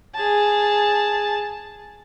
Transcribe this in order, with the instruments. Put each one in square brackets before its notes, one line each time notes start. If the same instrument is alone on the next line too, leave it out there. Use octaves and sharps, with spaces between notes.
[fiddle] G#4 A5